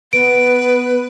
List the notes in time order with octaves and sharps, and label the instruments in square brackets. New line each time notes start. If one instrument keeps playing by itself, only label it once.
[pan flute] B3 [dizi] B4 [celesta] D7